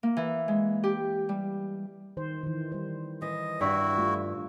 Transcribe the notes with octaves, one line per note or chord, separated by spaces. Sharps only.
A#3
E3
G#3
G4
G3
D#3 C5
D#3 E3
G3 C5
E3 D#5
G2 E4 F#4
G3 A3 F4